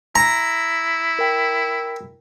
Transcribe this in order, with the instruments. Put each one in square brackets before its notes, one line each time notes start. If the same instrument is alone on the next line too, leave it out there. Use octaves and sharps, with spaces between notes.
[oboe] E4 [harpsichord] A#5
[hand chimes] A#4 G5